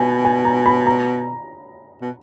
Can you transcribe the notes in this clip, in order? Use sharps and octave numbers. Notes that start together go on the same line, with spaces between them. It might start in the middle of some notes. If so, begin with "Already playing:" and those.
Already playing: B2 G#5 B5
G#5
A#5
B5
A#5
B2